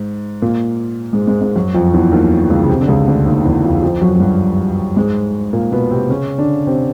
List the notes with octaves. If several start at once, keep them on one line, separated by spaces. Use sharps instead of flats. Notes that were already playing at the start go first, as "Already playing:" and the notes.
Already playing: G#2
A#2 A#3
G#2 G#3
G#2 G#3
G#2 G#3
F#2 F#3
F2 F3
E2 E3
D#2 D#3
C#2 C#3
C#3
C3
D3
C#2 C#3
D2 D3
D#2 D#3
E2 E3
F2 F3
F2 F3
F#2 F#3
F#3
G2 G3
G#2 G#3
A#2 A#3
B2 B3
C3 C4
C#3 C#4
D3 D4
C3 C4